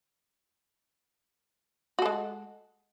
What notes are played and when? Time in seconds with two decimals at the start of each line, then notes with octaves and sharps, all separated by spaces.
1.99 F#4
2.02 A4
2.06 G#3